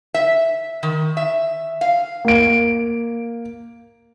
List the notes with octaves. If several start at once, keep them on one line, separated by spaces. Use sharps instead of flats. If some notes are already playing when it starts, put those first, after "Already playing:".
E5
D#3
E5
F5
A#3 D7